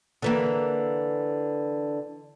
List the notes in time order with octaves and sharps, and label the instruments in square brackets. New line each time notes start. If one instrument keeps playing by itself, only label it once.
[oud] D3 E3 A#3